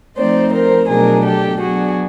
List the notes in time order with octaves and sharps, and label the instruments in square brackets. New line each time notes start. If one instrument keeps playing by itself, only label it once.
[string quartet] F3 A3 C4 D#4 C5 D5
A#4 C5
B2 F#3 A3 D4 G#4 A#4
G4 A4
F#3 B3 D4 F#4 G#4